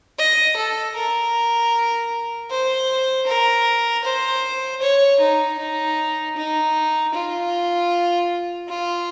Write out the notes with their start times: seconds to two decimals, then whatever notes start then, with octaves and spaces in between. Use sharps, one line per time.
0.19 D#5
0.57 A4
0.96 A#4
2.51 C5
3.27 A#4
4.04 C5
4.82 C#5
5.20 D#4
5.59 D#4
6.36 D#4
7.14 F4
8.68 F4